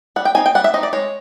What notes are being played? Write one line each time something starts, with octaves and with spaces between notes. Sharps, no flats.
G3 F#5
G5
C4 D#4 G#5
G5
G3 F#5
E5
C4 D#4 D#5
D5
G#3 C#5